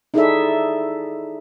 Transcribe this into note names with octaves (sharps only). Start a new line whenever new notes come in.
D#4 E4 G#4 A4 D5 E5